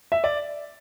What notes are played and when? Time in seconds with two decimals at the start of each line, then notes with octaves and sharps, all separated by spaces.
0.12 E5
0.24 D5